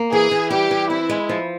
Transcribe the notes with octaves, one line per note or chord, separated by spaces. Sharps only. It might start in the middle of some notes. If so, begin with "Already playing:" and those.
Already playing: A#3
E3 G#4
E3
G3 G4
E3
C4 E4
G#3
F3